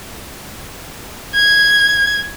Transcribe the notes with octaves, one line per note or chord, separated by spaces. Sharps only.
G#6